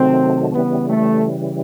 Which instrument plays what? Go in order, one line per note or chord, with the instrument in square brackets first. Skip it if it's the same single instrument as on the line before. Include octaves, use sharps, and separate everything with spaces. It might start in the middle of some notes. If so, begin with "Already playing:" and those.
Already playing: [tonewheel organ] C3 D#3 F#3 A3 [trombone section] C4
[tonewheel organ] C#3 E3 G3 [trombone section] B3
[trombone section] A3